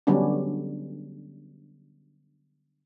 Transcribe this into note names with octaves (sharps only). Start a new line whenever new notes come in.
D3 F#3 G3 B3 C#4 D4